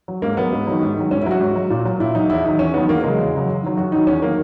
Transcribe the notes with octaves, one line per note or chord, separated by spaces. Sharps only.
F#3
G#2 A#3
F#3 B3
G#2
D#3 F#3
G#2
D#3 F#3
G#2 C#4
E4
F#3 F#4
G#2
F#3
A#2
F#3
A#2 E4
F#3 D#4
E2 E4
D#3 F#3 D#4
E2 C#4
D#3 F#3 B3
E2 A#3
C#3 F#3 G#3
E2
C#3 F#3
F#2
D#3 F#3
F#2 F#4
D#3 F#3 D#4
E2 C#4
D#3 F#3 A#3